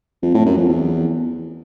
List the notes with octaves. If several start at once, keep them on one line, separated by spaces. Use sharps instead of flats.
F2
A2
F#2
F2
E2